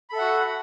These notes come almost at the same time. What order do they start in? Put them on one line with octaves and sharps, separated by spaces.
B5 A4 E5 F#5 F#4